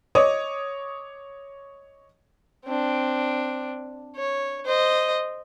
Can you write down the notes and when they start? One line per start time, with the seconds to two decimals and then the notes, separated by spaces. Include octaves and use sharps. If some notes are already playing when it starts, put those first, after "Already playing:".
0.15 C#5 D#5 D6 D#6
2.65 C4 D4
4.16 C#5
4.65 C5 D#5